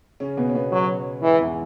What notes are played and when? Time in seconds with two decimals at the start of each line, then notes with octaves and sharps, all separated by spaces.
0.20 C#3 C#4
0.37 B2 B3
0.49 C#4
0.54 B2 B3
0.72 F#3
1.23 G#2 E3 G#3
1.40 E2 E3